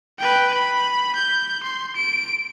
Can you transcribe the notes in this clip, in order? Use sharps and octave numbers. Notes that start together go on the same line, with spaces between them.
B4 G5
B5
G6
C6
D7